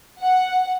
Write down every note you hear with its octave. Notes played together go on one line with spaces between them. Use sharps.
F#5